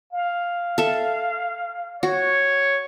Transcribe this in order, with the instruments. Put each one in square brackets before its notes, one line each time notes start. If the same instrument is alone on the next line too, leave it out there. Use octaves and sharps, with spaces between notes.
[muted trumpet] F5
[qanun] A4 E5
[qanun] F#4 [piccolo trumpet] C#5